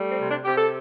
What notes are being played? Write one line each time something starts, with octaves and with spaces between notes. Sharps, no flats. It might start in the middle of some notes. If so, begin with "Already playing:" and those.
Already playing: G3 A3
C4
C3
D4
C3 G4
A4